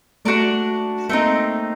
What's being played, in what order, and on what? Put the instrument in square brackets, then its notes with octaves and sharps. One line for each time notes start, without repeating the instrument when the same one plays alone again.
[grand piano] A3 [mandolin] D4 F#4 A#4 D5
[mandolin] A3 C4 D#4 [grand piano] A#3